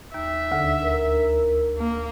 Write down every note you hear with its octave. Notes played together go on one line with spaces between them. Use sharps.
D#2 E5
D2 D3
A#4
A#3